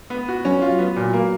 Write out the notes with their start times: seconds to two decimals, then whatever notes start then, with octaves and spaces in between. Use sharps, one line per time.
0.10 B3
0.28 F#4
0.45 F#3 C#4
0.62 F4
0.79 F#3 B3
0.96 A#2
1.13 A#3